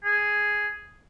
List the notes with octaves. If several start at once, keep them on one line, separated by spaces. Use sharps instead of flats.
G#4